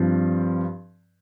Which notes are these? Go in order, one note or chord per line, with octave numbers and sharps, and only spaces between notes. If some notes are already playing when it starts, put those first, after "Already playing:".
Already playing: G2 F3 C4